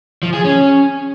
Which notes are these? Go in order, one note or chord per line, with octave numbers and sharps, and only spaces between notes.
F3
G#4
C#4